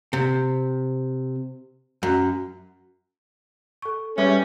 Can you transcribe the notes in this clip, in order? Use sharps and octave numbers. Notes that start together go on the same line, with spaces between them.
C3
F#2
A4 C#6
G3 C#4 G#4 B4 E5